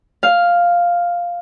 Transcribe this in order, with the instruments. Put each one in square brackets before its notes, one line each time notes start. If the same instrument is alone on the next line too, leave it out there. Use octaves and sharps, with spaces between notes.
[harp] F5